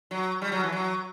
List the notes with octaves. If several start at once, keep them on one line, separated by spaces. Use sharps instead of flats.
F#3
G3
F#3
E3
F#3